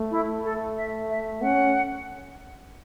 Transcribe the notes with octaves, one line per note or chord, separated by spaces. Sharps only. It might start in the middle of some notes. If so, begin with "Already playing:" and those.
Already playing: A3
E4
A4
E5
E5
C#4 F#5